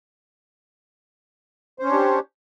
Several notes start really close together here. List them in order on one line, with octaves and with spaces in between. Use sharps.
C5 C#4 C#5 D4 G4